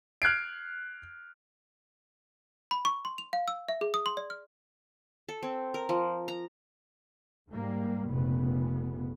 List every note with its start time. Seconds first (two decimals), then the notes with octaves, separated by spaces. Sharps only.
0.22 F6 F#6 G#6 C7 D7
2.71 B5
2.85 C#6
3.05 C6
3.18 F7
3.33 F5
3.48 E6
3.68 E5
3.81 G#4
3.94 D#6
4.06 C6
4.17 D5
4.30 F6
5.29 A4
5.43 C4
5.74 A#4
5.89 F3
6.28 A#5
7.51 G#2 G3 A#3
8.08 F1 A#2 C#3 B3